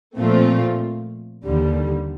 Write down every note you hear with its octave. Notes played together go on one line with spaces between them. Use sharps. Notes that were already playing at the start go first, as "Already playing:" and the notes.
A#2 F3 A3 C4 F4
D#2 D3 G3